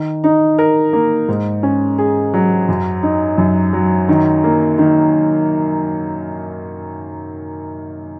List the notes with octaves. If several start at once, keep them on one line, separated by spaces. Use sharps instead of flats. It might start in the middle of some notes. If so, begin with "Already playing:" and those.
Already playing: D#3
D#4
A#4
A#3
G#2
C#4
G#4
F#3
F#2
D#4
F#2
F#3
D#3
A#3
D#3